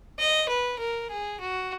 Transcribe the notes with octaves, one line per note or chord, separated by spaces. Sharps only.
D#5
B4
A#4
G#4
F#4